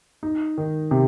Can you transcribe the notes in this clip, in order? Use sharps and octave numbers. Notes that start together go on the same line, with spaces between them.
D#4
D#3
C3